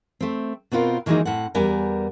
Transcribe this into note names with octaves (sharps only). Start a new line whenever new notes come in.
A3 C4
B2 B3 C4 F4 A#4
D#3 E3 F#3 G#3 A#3 D#4
A2 C4 F#5
E2 G3 B3 A#4 G#5